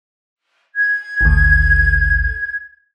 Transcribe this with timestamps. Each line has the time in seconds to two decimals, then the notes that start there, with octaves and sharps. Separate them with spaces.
0.75 G#6
1.21 G#1 D2